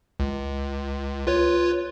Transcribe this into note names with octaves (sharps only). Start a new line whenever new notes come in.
C#2
F4 B4 C#5